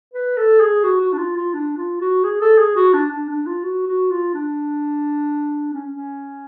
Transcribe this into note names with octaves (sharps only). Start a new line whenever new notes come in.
B4
A4
G#4
F#4
F#4
D4
F4
F4
D4
F4
F#4
G#4
A4
G#4
F#4
D4
D4
D4
F4
F#4
F#4
F4
D4
C#4
C#4